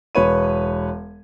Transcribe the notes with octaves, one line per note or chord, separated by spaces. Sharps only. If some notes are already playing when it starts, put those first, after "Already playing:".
E1 B4 C#5 D#7